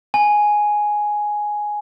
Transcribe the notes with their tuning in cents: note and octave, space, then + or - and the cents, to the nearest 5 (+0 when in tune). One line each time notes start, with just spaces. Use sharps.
G#5 +5